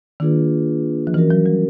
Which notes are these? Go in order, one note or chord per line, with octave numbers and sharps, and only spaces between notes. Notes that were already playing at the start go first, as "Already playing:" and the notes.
D#3 A#3 D4 F4 G#4 B4
F3
E3 C#4 F#4 A#4
F#3
G3